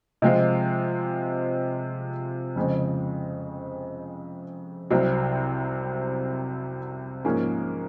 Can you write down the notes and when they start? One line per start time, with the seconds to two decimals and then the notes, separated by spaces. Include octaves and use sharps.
0.22 C3 F3 G#3 C4 F4
2.56 F2 C#3 G#3 C4
4.90 C2 C3 F#3 C4
7.25 G#2 F3 A#3 C#4 G#4